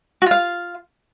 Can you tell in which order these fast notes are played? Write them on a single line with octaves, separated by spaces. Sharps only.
F#4 F4 F5